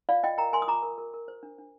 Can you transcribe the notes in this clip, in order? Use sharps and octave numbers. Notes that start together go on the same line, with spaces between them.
F4 D5 F5
F4 D#5 G5
A#4 G5 A#5
A#4 G#5 C6
D#6
F4 A#5 D6
A#4
A#4
A#4
C5
D4
D4